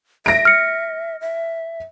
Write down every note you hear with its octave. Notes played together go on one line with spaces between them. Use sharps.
E5 A#6 D7
F6 C#7
E5